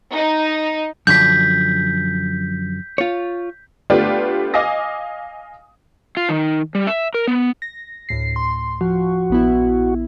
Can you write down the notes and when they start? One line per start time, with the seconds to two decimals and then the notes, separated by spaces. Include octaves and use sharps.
0.13 D#4
1.07 F#2 D3 F3 G6 B6
2.98 F4 C#5
3.90 A3 B3 D4 F4 G4 B4
4.54 D#5 F5 G#5 D6 D#6 A#6
6.17 F4
6.29 D#3
6.75 G3
6.87 E5
7.14 A#4
7.27 B3
7.62 A#6
8.09 D2 A2 C7
8.36 C6
8.81 F3 F#4
9.30 A#1 B3 E4